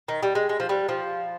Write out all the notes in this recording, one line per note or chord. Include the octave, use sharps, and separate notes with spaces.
D#3
G3
G#3
G#3
F3
G3
F3